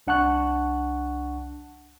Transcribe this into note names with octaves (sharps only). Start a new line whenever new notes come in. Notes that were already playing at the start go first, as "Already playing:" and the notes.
C2 D4 F#5 A5 C#6 F#6